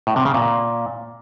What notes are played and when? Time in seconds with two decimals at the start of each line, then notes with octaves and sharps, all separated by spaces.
0.07 A2
0.16 C3
0.25 C#3
0.34 A#2